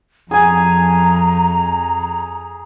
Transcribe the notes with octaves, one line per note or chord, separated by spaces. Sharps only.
F2 G#4 G#5 A#5